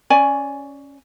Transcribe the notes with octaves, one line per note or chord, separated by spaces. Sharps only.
C#4 C#5 D5 G#5